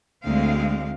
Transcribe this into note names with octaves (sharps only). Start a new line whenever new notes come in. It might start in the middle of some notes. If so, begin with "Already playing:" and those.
D2 D3 G#3 C4 F5